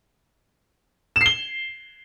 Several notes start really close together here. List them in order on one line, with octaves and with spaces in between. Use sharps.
E7 C7 G7